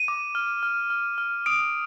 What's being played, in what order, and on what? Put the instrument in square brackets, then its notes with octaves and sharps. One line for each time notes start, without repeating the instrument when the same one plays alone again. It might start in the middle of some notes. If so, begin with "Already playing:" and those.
Already playing: [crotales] D#7
D6
F6
F6
F6
F6
D#6 D7